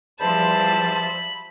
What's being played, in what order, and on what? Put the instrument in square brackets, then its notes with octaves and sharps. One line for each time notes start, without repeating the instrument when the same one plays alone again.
[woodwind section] E2 C5 [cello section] F3 G3 E5 [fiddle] A5 [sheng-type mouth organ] B5